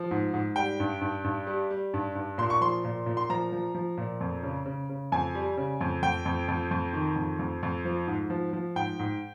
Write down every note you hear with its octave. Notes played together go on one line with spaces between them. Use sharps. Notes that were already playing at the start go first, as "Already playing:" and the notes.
Already playing: F3
G#2
G#2
G3 G5
G2
G2
G2
G3
G3
G2
G2
A#2 C6
C#6
F3 C6
A#2
A#2
C6
F3 A#5
F3
F3
A#2
F2
C#3
C#3
C#3
F2 G#5
G3
C#3
F2
F2 G5
F2
F2
F2
D#3
F2
F2
F2
F3
G#2
F3
F3
G#2 G5
G#2